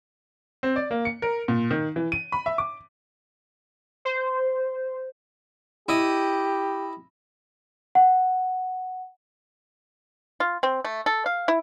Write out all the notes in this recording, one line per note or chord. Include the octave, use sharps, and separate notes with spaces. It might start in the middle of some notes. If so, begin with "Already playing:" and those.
C4
D5
A#3
C#7
A#4
A#2
D#3
E3
D#7
B5
E5
D6
C5
E4 G4 D#5
F#5
F4
C4
A3
A4
F5
E4